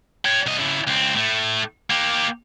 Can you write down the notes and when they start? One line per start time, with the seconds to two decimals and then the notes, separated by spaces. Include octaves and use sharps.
0.25 C#5 G5
0.46 C2 D#5
0.58 C#3 E4
0.87 C#2 C4
1.15 A2 A3
1.90 A#3 G4